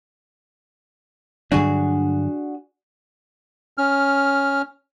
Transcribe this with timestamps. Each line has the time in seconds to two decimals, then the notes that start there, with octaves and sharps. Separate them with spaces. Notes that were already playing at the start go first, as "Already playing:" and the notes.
1.52 G2 D3 F#3 D4 F#4 G#4
3.78 C#4 F6